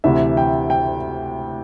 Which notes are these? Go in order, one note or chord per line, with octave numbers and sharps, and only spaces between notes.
D2 C3 E3 E5
G5
G5